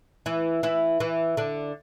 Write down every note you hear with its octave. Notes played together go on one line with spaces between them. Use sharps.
E3 E4
E3 E4
E3 E4
D3 D4